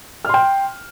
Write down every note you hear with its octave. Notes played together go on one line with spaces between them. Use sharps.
G5 C6 F6